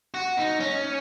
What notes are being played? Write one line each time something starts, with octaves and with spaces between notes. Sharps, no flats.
F#4
D#4
C#4